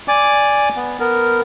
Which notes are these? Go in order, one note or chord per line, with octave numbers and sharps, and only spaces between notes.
D5 G#5 D6
B3
B3 A#4